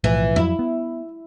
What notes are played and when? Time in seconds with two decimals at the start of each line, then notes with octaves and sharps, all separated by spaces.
0.04 B1 A2 E3 F3
0.36 F2 F3 F#3 E4
0.59 B3